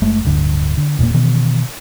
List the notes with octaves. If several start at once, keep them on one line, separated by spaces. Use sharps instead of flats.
F#1 G#3 A3
D1 G2 D3
D3
E1 A#2 C#3 A#3
B2 D#3 E3 B3